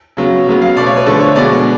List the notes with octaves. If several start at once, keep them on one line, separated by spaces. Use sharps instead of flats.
C#3 F#3 B3
C#3 F#3 B3
F5
B2 A3 D5
C#5
B4
D3 F3 A3 A4
C#5
B2 G#3 B3 D5